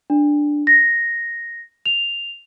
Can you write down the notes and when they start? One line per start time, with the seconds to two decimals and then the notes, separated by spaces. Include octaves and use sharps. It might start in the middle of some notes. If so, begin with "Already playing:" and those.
0.10 D4
0.67 A#6
1.86 F7